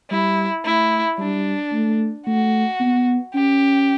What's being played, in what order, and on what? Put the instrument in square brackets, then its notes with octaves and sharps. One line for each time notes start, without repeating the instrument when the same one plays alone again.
[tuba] G3 [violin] E4
[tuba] A3 [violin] E4
[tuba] G3 [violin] D4
[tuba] A3
[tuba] A3 [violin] F#4
[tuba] B3
[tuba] C#4 [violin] G4